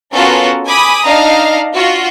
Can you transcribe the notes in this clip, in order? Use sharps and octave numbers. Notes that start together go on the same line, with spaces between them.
B3 C#4 F4 F#4 A4 A#4
G#5 B5 D6 D#6
D4 D#4 D#5 F5 A#5
F4 F#4